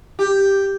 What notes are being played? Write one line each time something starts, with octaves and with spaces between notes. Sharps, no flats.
G4